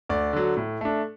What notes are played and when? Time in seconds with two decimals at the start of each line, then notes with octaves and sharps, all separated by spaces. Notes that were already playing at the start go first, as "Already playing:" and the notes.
0.09 D2 D5
0.33 D3 F#3
0.57 A2
0.81 A3 D4